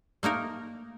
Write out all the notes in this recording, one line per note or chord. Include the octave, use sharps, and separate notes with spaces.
A3 A#3 D#4 A#4